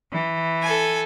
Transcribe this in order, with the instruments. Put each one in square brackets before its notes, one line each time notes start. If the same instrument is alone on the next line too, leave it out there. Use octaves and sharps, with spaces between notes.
[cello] E3
[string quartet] A4 G#5